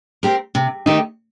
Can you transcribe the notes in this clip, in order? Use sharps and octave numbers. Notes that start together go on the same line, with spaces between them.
C4 G4 A#4
C3
D#3 A3 D#4 G4